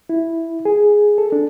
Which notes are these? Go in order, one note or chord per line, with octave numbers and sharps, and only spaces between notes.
E4
G#4
A4
D4